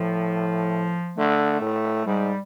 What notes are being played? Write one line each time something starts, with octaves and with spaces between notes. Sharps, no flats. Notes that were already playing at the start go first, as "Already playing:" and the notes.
Already playing: A2 F3
D3 A3
A2
G#2 G3